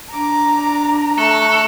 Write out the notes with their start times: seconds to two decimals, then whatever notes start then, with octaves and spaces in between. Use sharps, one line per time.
0.13 D4 A#5 D6
1.18 A3 A4 C#6 F#6